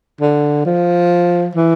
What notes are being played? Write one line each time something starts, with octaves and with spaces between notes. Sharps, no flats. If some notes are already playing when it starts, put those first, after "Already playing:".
D3
F3
E3